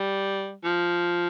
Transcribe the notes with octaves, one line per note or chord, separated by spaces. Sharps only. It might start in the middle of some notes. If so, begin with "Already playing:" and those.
Already playing: G3
F3